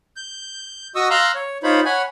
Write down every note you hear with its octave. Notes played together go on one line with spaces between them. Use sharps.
G6
F#4 D#5 C#6 D#6 E6
F5 A#5 C6 E6 F#6
C#5
D#4 F4 C5 C#5 B5
C#5 F#5 G#5 B5